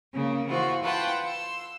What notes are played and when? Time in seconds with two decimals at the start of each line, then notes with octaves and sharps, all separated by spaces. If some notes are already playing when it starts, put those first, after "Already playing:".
0.13 C#3 A#3
0.47 E3 F4 F#4 C5
0.83 F4 B4 F#5 G5 A5
1.25 C6 E6